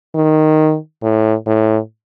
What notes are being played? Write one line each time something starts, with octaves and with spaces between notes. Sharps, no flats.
D#3
A2
A2